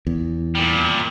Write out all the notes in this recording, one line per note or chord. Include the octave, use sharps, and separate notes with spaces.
E2
A#2 G3